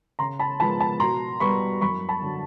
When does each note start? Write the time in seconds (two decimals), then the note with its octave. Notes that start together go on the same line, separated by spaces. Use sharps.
0.19 C#3 A#5 C6
0.39 A5 B5
0.60 F3 G#3 B3 A5 B5
0.80 A5 B5
1.00 B2 A#5 C6
1.40 G3 B3 B5 C#6
1.81 F#2 B5 C#6
2.09 A5 B5
2.22 D3 F#3